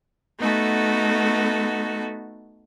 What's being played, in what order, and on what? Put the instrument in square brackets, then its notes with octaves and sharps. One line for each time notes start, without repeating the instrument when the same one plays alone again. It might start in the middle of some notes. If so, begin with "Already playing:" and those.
[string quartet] A3 B3 D#4 F#4 A4